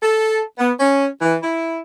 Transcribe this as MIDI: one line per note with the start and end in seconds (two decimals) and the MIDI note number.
0.03 0.40 69
0.58 0.71 59
0.80 1.07 61
1.21 1.35 52
1.43 1.78 64